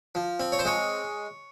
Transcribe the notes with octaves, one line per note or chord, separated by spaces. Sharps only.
F3
C4
C#5
C5
G#3 C#5